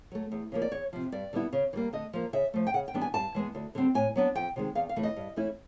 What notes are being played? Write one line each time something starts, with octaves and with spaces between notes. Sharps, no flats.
F#3 A3
E2
C#3 F3 A#3
D5
E2 C#5
C3 F3
G2 D5
D3 G3 B3 E4
C#3
E3
G3 A#3
D3 D#5
F3 A#3
C#3 E5
F3 A3
G5
C#3 F#5
G5
E3 G3 B3 D4
G#5
G2 A5
E3 G#3 B3
D2
D3 G3 C4
A2 G#5
F#3 B3 D4
F2 G5
C3 D#3 G#3
E2 F5
F5
C#3 E3 A3
D#5
G2
E3 A3 C#4 E4